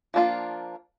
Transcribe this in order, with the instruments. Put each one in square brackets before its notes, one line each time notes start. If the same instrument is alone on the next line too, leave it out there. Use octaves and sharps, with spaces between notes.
[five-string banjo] F3 A#3 D4 F4